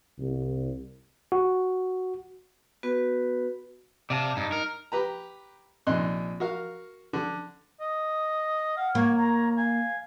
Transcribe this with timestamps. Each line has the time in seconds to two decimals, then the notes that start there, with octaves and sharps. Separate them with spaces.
0.19 C2
1.32 F#4
2.83 B3 F#4 B4
4.10 C3 D5 F5 A5
4.37 G2 D#4
4.52 A#4
4.92 G4 B4 A#5
5.87 A#1 C3 D#4 C6 F#6
6.40 F#4 A#4 F5
7.13 D3
7.80 D#5
8.77 F5 F#5
8.95 A#3 C#5
9.17 C#5 A#5
9.57 F5 G#5